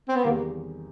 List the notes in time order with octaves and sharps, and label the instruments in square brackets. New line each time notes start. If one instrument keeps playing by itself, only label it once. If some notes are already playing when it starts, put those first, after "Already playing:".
[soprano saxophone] C4
B3
[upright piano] E2 C3 D#3 G3 [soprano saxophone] A#3